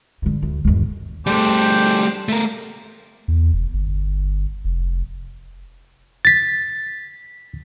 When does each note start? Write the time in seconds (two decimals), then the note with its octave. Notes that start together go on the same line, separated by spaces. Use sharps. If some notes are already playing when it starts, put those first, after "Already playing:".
0.22 G2 D3
0.42 D2
0.65 G1 D#2
1.27 G3 A3 D4 G4 C5
2.29 A3 A#4
3.28 E2
3.53 F1
3.74 G1
4.65 F1
6.25 A6 B6